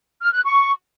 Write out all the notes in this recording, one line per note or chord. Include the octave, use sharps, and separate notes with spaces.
F6
F#6
C#6